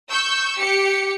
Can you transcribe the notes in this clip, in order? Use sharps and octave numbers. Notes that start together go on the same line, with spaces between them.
C#6 E6 G6
G4 C#7